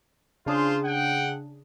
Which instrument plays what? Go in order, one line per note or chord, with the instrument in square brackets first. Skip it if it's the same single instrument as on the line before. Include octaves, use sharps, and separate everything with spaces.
[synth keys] C#3 D4 G#4 [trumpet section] F4 C5
[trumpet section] F#5 G5